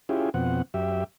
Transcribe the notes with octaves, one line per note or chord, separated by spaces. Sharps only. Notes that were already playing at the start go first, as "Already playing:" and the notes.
C#4 E4 F4 G4 G#4
F2 B2 C4 F#5
F#2 G4 E5